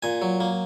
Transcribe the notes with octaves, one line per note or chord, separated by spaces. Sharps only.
A#2 G#5
F#3
A#3